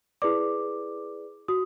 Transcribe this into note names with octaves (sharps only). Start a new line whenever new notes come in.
E4 G#4 B4 D5 D6
F#4 D#6